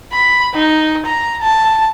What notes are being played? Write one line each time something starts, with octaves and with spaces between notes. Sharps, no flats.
B5
D#4
A#5
A5